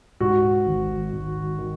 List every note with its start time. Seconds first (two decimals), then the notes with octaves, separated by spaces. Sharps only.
0.20 G#2 F#4
0.67 G#1
1.12 G#1
1.59 D#3